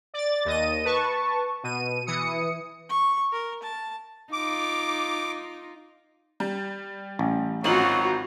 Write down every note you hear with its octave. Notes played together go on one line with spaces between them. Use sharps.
D5 A6
D#2 D#5 D#7
B4 A5 C#6
B2 D#7
E3 D#6 C#7
C#6
A#4
A5
D#4 F4 D6
G3
A1
G#1 F#3 D#4 F4 F#4 F#7